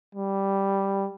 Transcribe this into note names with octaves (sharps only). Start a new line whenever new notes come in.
G3